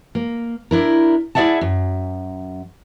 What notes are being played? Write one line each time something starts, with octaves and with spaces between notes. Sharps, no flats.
A#3
D4 E4 A#4
E4 G#4 D5 E5 F#5 A5
F#2